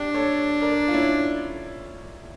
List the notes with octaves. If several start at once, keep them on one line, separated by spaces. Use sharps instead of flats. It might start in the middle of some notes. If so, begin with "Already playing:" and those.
Already playing: D4 G4
A4 C#5
A#4 D5
F4
C#4 E4